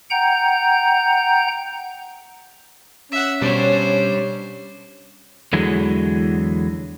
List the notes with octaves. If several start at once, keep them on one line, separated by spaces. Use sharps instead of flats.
F#5 G5 A#5 G6
C#4 E5 F#5
B2 G3 D4 C5 C#5
E2 D3 E3 F#3 G#3